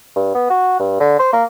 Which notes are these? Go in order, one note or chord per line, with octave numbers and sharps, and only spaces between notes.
G2
B3
F#4
G2
D3
C5
A#3